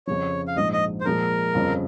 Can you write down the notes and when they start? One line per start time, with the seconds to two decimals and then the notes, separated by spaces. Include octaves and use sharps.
0.07 F2 C#3 F3 C#5
0.47 F5
0.56 A#1 G#2 F3 D#5
0.73 D#5
1.01 C5
1.05 A#2 F3 G#3 A#4
1.54 G1 F2 C#3 F3